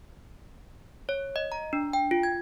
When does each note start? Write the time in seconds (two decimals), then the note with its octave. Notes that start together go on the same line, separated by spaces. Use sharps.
1.09 C#5
1.36 D#5
1.52 A#5
1.73 D4
1.93 G5
2.11 F4
2.23 G#6